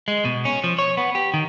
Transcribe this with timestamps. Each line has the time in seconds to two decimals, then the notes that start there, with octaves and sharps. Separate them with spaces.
0.08 G#3
0.25 B2
0.45 C#4
0.64 F3
0.79 C#5
0.97 B3
1.15 G4
1.34 D#3